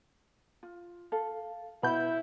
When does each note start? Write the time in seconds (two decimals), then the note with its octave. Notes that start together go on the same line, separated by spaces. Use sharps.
0.63 F4
1.12 A4 F5
1.83 B2 E4 B5 G6